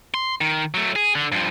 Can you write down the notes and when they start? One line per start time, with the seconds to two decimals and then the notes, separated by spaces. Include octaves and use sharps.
0.14 C6
0.41 D#3
0.74 F#3 A3
0.96 G#4
1.15 D3
1.32 G2 F3